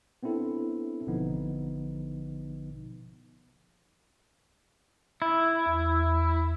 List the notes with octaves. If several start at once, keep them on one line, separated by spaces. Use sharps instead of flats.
B3 C4 D4 E4 A4
A1 B2 D3 F3 B3 D#4
E4
E2